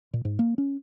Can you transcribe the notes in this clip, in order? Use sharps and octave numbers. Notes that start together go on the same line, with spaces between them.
A#2
G#2
A#3
C#4